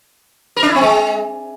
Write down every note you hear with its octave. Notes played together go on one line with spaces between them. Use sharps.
A#4
D4
E4
C4
G#3